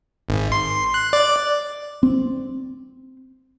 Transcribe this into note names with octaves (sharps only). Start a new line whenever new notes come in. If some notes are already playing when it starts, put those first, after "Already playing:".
G#1
C6
F#6
D5
C4